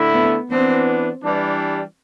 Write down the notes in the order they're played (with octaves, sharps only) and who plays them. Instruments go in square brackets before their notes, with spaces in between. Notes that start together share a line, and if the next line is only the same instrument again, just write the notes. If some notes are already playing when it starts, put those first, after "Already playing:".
Already playing: [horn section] D3 A3 E4
[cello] B3
[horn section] E3 B3 D4 [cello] C4
[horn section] E3 G3 D4